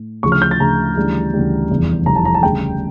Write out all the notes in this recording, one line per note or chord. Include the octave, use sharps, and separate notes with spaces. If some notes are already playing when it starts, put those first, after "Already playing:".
Already playing: A2
D2 C#3 F3 C#6
F6
G6
A6
D2 C#3 F3 A#5
D2 C#3 E3 G3
D2 C#3 E3 G3
F1 E2 E3 G3
F1 E2 E3 G3 A#5
A5
A#5
A5
D2 C#3 G3 G5